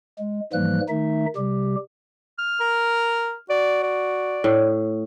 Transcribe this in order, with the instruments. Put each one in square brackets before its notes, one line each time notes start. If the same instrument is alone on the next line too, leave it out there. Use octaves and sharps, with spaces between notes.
[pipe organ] G#3
G#2 E3 F3 G3 A#3 F#6
D#3 A3 D#4 E5
C3 G3 G4
[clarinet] F6
[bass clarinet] A#4
[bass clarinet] F#4 [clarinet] D5
[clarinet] D5
[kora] A2